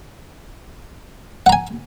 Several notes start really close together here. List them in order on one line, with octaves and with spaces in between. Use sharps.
F#5 A#5 G#5